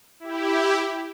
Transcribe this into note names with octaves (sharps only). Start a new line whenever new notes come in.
E4 G4